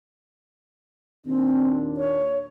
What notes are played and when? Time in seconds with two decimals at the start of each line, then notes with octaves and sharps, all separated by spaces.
1.26 D#2 A#2 C4 D4
1.97 C#5